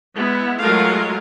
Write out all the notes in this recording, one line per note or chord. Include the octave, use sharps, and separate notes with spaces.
G#3 B3 E4
F#3 G#3 A3 F4 A#4 F5